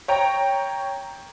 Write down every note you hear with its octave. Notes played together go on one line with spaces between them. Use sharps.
C#5 G5 A#5